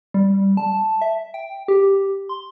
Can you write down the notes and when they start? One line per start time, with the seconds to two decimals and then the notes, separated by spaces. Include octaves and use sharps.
0.14 G3
0.57 A5
1.02 E5
1.34 G5
1.68 G4
2.29 C6